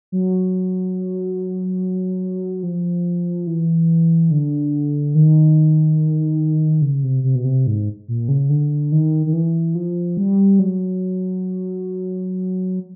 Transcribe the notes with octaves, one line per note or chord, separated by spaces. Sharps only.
F#3
F3
E3
D3
D#3
C#3
C3
C3
B2
C3
G#2
A#2
C#3
D3
D#3
D#3
E3
F3
G3
F#3